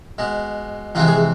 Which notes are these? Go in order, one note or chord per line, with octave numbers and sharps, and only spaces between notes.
B2 G#3
F2 C3 E3 G#3 F4
G#4